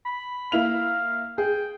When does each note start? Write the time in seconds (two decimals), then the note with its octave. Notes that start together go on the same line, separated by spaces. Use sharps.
0.05 B5
0.52 A#3 E4 F5 F7
1.38 G#4 G5